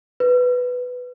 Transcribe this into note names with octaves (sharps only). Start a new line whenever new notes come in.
B4